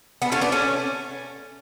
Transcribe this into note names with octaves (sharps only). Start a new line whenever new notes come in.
B3 D4
A3 C#4
B3 D4
A3 C#4